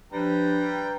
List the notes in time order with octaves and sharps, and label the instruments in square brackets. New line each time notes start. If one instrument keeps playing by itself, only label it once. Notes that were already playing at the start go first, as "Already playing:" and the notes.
[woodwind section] F3 D4 [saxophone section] G3 [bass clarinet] B4 [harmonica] G5 A#5